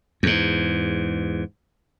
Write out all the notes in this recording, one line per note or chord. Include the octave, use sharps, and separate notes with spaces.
E2 G#2